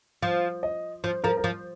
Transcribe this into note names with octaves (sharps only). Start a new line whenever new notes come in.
F3 F5
D#5
F3 C5
F3 A#4
A#4
F3 C5